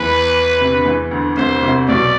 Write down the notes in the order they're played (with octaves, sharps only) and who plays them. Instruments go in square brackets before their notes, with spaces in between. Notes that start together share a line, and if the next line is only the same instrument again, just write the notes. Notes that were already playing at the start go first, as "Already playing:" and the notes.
Already playing: [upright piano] E2 E3 [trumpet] B4
[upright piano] C3
D3
E2 E3
D2 D3
[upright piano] C2 C3 [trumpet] C5
[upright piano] C2 C3
[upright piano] B1 B2 [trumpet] D5